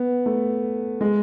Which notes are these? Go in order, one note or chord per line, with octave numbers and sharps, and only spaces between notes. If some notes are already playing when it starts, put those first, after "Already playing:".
Already playing: B3
A3
G#3